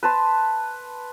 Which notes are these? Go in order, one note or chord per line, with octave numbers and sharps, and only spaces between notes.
B4 A5 C6